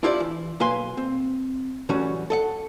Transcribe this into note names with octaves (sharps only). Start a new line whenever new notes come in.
D4 E4 F4 G4 B4 D5
E3
B1 A#3 B4 F5 G#5 C6
C4
A2 E3 F#3 G3 C#4 F#4
A4 D#5 F#5